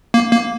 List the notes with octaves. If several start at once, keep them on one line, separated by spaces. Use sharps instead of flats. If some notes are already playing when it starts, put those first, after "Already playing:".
A#3
A#3